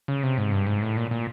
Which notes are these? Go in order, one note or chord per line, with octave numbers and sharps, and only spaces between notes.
C#3
C3
G#2
G2
G#2
A2
A#2
A#2